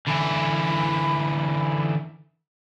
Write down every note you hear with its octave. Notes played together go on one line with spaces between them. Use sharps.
D3 E3 B5